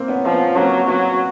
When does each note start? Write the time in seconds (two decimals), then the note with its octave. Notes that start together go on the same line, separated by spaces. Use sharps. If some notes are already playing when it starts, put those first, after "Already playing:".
Already playing: A#3 C4
0.08 B3 C#4
0.25 F3
0.32 B3 C#4
0.56 F#3 A#3 C4
0.88 F#3 B3 C#4